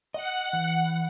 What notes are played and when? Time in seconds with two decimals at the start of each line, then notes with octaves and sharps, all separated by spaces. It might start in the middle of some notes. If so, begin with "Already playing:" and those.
0.14 D#5 F#5
0.53 E3